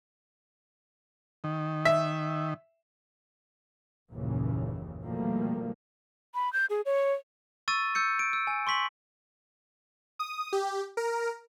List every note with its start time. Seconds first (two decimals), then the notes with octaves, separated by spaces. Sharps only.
1.44 D#3
1.85 E5
4.11 F#1 D#2 A#2 C#3 E3
5.03 B2 D#3 F3 G3 A3 A#3
6.35 B5
6.53 G6
6.70 G#4
6.86 C#5
7.68 C#6 E6 A6 D#7
7.95 E6 G6 C#7
8.19 D7
8.33 E6
8.47 G#5
8.67 C6 C#6 B6 F#7
10.19 D#6
10.53 G4
10.97 A#4